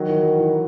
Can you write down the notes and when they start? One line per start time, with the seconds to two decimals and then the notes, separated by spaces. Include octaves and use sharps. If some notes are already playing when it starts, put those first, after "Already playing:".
Already playing: D#3 F#3
0.09 E3
0.23 F#3
0.39 E3